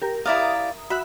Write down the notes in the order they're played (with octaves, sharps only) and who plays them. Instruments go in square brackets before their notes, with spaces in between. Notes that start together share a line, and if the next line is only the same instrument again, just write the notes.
[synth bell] G4 A#4
[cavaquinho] E4 D5 F5 [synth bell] E5 A#5 D#6
[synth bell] F#4 E5 F#6 [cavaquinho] B5